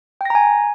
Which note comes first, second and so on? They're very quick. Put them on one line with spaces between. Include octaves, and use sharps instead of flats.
G5 A#6 A#5 G#5